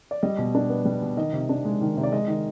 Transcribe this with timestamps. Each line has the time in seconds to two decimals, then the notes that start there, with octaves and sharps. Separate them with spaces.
0.11 D5
0.23 G3 D#5
0.38 B2
0.55 D4
0.70 B3
0.85 G3
1.02 B2
1.17 D#3 D#5
1.33 C3
1.49 D4
1.65 G#3
1.81 D#3
1.97 C3
2.03 D5
2.12 G#3 D#5
2.28 D#3